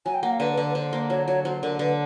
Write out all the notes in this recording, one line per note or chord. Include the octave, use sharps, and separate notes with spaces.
F#3 G#5
G5
A#3 F#5
F5
D3 B4
B4
D3
B4
D3 C5
A#3
F#3 C#5
F#3 C#5
F#3 C5
D3 A#4
D3 B4